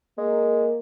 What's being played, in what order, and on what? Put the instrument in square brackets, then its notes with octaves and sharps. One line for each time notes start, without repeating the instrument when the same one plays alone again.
[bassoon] G#3 [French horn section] A#3